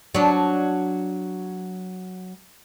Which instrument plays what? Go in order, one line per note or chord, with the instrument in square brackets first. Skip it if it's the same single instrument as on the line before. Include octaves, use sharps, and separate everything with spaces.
[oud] F#3 D4